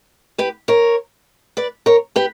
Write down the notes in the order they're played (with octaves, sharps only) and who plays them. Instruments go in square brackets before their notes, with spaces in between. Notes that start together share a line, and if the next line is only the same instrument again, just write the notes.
[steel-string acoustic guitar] G4 B4
A#4 C#5
B4 D5
A#4 C#5
G4 B4